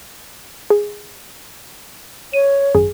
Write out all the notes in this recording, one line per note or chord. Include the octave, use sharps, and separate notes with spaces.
G#4
C#5 D#7
G#1 F#2 G#4